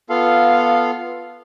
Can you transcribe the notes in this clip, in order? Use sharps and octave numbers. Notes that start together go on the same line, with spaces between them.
B3 F4 A4 F5